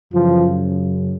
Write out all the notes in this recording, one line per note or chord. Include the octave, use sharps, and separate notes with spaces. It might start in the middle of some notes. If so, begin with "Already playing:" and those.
F#2 C#3 E3 F3 F4